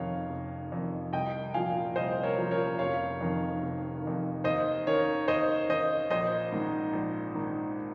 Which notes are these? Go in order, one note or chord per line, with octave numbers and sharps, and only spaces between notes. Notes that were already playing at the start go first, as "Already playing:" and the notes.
Already playing: F1 F2 D#3 C#5 F5
F1
F2 D#3
C2 D#5 G5
A#2 F3 F5 G#5
C2 C5 D#5
A#4 C#5
A#2 F3
A#4 C#5
F1 C#5 F5
F2 D#3
F1
F2 D#3
D#2 C5 D#5
D#3 A#4 C#5
D#2 C5 D#5
D#3 C5 D#5
A#1 C5 D#5
G#2 D#3
A#1
G#2 D#3